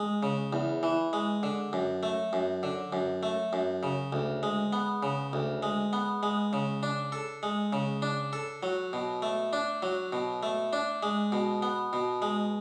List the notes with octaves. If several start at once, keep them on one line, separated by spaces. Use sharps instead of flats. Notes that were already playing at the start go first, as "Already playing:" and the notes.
Already playing: G#3
C#3
E2
E3
G#3
D3
F#2
A3
F#2
D3
F#2
A3
F#2
C#3
D2
G#3
B3
C#3
D2
G#3
B3
G#3
C#3
D4
A4
G#3
C#3
D4
A4
F#3
B2
A3
D4
F#3
B2
A3
D4
G#3
B2
B3
B2
G#3